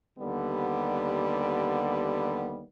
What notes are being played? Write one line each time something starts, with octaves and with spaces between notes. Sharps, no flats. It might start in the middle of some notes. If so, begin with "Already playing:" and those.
D#2 D3 G3 B3